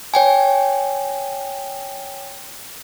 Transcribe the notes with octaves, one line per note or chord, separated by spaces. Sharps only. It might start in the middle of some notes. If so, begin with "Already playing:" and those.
C#5 G5 G#5